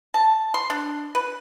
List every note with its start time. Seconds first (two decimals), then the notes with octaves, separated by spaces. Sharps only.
0.14 A5
0.54 C6
0.70 D4
1.15 B4